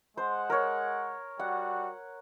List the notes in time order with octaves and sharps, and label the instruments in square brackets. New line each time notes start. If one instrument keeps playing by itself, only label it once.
[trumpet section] G#3 F#5 [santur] C5
[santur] A#4 C#5
[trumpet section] G3 F#4 [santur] F#5